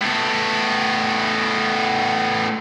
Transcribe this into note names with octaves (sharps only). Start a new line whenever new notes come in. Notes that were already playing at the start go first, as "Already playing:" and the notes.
A2 B3